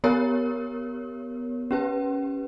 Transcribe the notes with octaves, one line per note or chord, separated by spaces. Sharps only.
B3 G4 A#4 C#5
C#4 G4 B4